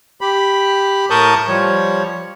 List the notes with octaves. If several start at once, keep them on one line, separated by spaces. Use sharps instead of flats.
G4 B5
A2 A#4 A5 C#6 D#6 G6
F3 G3 C#5